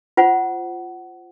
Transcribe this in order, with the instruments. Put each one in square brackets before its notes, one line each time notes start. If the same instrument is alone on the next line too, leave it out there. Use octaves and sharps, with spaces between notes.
[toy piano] F4 C5 F#5